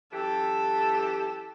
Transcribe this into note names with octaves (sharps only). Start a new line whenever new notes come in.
F#2 E3 G4 A4